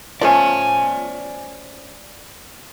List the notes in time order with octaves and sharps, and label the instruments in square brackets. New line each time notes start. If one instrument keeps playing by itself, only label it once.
[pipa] F3 A3 C#4 [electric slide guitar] D5 G#5